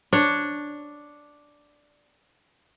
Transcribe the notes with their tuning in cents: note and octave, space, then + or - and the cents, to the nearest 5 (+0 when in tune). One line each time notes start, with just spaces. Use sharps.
D4 +0 C#5 +0